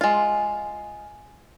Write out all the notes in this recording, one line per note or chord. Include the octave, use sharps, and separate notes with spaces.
G#3 F4